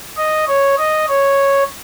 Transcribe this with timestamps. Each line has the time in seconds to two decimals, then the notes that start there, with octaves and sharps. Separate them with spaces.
0.17 D#5
0.48 C#5
0.78 D#5
1.09 C#5